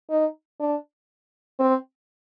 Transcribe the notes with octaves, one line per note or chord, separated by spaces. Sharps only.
D#4
D4
C4